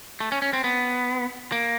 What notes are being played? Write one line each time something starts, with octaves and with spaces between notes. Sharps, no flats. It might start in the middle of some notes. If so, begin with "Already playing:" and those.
A3
C#4
C#4
C4
B3
A#3